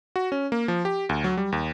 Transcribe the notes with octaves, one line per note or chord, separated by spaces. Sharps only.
F#4
C#4
A#3
F3
G4
D2
F#3
G3
D#2